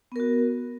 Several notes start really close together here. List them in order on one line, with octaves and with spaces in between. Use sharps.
B3 A#4 F#4